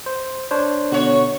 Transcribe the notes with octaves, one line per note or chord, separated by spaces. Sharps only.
C5
D4 C5 C#5
B2 D3 F#4 C#5